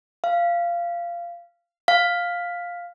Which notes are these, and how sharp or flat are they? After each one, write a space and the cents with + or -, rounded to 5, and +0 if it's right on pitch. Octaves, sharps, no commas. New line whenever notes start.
F5 -15
F5 +5